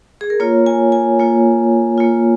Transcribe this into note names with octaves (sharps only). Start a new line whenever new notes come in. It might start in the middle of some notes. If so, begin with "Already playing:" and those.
G#4
A#4
A#3 F4 C#5
G#5
G#5
A#3 F4
A#3 F4